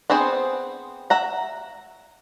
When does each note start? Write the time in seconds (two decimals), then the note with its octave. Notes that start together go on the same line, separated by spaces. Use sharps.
0.10 B3 C4 G#4 C5
1.10 E5 F#5 A#5